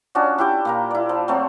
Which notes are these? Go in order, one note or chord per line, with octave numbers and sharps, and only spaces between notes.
C#4 D4 F4 F#4
E4 G4 G5 D6
A#2 A#3 A#5
E4 D5
F3
F#3 A3 C4